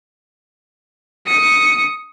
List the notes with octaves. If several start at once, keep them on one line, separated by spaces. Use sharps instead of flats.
D#6 C#7